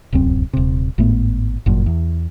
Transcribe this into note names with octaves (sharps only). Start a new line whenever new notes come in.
D1 C2 F#2 C4
D#1 C3
G#1 A2 A3 B3
G1 F#2 A#2
E2